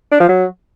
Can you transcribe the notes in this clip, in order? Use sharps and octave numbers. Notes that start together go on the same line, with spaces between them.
D4
F3
F#3